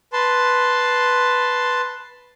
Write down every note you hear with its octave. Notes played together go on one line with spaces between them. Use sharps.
B4 A5 C6